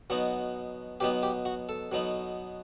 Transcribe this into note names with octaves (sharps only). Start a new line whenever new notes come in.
B2 F#3 B3 D#4 F#4
B2 F#3 B3 D#4 G4
G4
F#4
A4
B2 F#3 B3 D#4